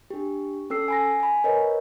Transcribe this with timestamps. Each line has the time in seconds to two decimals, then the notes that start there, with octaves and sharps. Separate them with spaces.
0.11 D4 G4
0.70 C#4 A4 E6 C7
0.88 G#5 B5 A#6
1.20 G#5 B5
1.44 A#4 B4 C#5 D#5